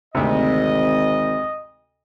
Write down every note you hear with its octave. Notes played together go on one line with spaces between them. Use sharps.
G#1 D2 C3 D#5